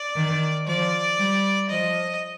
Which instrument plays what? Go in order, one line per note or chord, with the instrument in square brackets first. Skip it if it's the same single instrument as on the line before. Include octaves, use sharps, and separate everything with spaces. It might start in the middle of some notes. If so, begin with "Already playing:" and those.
Already playing: [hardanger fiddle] D5
[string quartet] D#3
[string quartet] F3 [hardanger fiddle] D5
[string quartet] G3
[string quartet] F3 [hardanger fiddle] D#5